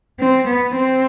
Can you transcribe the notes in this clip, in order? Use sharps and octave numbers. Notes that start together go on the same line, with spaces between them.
C4
B3
C4